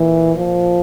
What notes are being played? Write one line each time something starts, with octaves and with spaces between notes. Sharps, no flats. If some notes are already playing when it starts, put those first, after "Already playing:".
Already playing: A#2 E3
F3